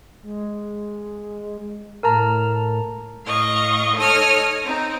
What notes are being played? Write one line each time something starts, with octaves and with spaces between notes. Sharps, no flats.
G#3
A2 A#4 A5 A#5
A2 D#5 F5 C#6
D#4 A4 C#5 D#6 F6
C4 D#4